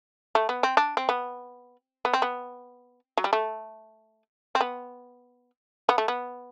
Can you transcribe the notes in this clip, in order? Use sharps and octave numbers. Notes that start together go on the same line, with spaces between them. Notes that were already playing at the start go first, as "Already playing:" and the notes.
A3
B3
C4
D4
C4
B3
B3
C4
B3
F#3
G3
A3
C4
B3
B3
A3
B3